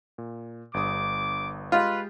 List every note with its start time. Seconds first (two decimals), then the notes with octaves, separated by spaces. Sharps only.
0.18 A#2
0.74 G1 G2 D6 D#6
1.72 G#3 F4 G4 B4 D#5